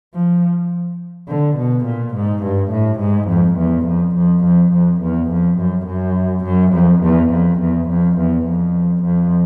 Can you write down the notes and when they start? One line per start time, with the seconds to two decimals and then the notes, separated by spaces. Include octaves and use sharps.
0.14 F3
1.28 D3
1.57 B2
1.85 A#2
2.15 G#2
2.44 G2
2.71 A2
3.00 G#2
3.29 F2
3.58 E2
3.86 F2
4.16 F2
4.44 F2
4.73 F2
5.02 E2
5.31 F2
5.59 F#2
5.87 F#2
6.45 F#2
6.73 F2
7.03 E2
7.31 F2
7.61 E2
7.89 F2
8.18 E2
8.46 F2
9.03 F2